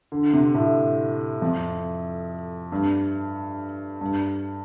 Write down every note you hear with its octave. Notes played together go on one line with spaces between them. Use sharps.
D3
C3
A2
F2
G2
G2